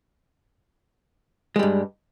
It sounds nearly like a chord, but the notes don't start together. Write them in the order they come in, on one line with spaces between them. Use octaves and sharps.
G#3 G3 G2